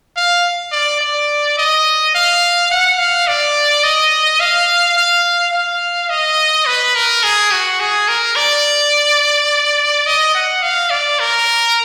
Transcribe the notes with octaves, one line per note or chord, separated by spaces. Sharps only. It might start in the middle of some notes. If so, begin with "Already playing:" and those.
F5
D5
D5
D#5
F5
F#5
F5
D5
D#5
F5
F5
F5
D#5
B4
A#4
G#4
F#4
G#4
A#4
D5
D#5
F#5
F5
D5
A#4